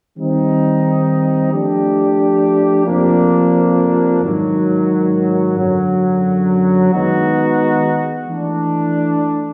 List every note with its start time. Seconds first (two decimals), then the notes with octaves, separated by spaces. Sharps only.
0.16 D#3 G3 C4 D#4
1.51 F3 A3 D4 G4
2.86 F2 C3 F3 A#3 D4
4.22 G#2 D#3 F#3
5.56 F#2 D3 F#3
6.92 D#3 G#3 B3 D#4 F#4
8.27 E3 A3 D4